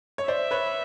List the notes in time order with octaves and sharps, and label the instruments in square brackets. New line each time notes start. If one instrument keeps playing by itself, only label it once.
[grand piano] C#5
[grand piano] C5 D5 [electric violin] E5
[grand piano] B4 C#5